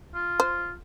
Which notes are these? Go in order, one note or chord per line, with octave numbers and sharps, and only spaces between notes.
F4
C5